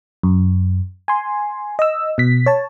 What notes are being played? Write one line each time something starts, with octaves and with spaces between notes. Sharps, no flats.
F#2
G#5 C6
D#5 E6
B2 B6
C#5 A5